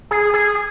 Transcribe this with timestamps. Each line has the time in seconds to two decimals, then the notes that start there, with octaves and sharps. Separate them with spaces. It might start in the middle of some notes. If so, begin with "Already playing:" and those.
0.11 G#4
0.34 G#4